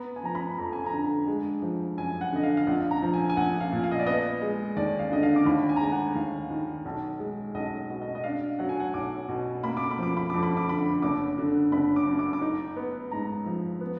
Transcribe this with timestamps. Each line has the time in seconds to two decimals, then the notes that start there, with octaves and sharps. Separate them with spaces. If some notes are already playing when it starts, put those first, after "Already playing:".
Already playing: B3 A#5
0.16 G#5
0.23 F3 A#5
0.35 B5
0.58 F2 A#5
0.73 G#5
0.86 A#5
0.93 D3
1.27 G#3
1.62 F3
1.97 F#2 G#5
2.21 F#5
2.33 D3 D#5
2.43 F5
2.57 F5
2.67 A#1 F#5
2.91 A#5
3.02 F3
3.13 G#5
3.30 G#5
3.37 A#1 F#5
3.61 F5
3.72 A#2
3.84 F5
3.91 D#5
3.99 D5
4.06 B3 D#5
4.42 G#3
4.76 D#2 D5
4.99 F5
5.11 D3 D#5
5.23 F5
5.36 D6
5.45 D#2 B5
5.69 G#5
5.76 A#5
5.80 G#3 G#5
5.92 F#5
6.15 D#2 F5
6.50 D#3
6.85 B1
7.19 G#3
7.54 B1 D#5
7.90 B2
8.02 D#5
8.15 D#5
8.24 D4 F5
8.59 F#3 F#5
8.69 G#5
8.80 F#5
8.94 B1 D6
9.29 B2
9.63 A#3 B5
9.77 D6
9.91 B5
9.98 F3 D6
10.17 B5
10.30 F2 D6
10.43 B5
10.57 D6
10.68 D3 B5
11.02 F#1 D6
11.38 D3
11.72 F#1 B5
11.96 D6
12.07 F#2
12.19 D6
12.33 D6
12.41 D#4
12.76 B3
13.11 G#2 A#5
13.46 F3
13.81 B3